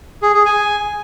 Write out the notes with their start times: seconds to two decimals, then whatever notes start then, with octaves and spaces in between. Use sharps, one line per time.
0.22 G#4
0.34 G#4
0.46 G#5